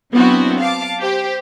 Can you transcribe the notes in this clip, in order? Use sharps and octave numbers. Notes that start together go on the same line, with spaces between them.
F#3 B3 C4 D4 E4 F#4
F5 A5 D6
G4 C5